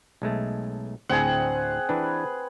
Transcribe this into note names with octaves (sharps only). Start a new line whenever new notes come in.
B1 G#3 A3
D2 A2 C4 G#4 F#5 A#5
E3 D4 B4